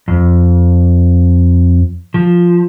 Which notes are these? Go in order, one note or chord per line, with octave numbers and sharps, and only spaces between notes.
F2
F3